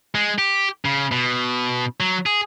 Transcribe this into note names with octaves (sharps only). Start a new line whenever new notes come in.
G#3
G4
C#3
B2
F#3
G#4